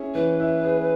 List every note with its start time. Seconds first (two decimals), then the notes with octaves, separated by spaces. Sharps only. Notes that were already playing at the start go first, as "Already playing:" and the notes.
Already playing: C#4 E4 G#4
0.15 E3 B4
0.40 E4
0.65 G#4